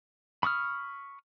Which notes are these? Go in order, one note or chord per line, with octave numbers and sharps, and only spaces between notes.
B5 C#6 D#6 F6